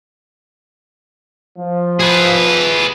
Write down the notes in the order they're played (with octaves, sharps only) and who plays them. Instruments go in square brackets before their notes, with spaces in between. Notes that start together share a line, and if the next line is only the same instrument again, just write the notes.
[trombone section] F3
[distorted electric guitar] G#4 B4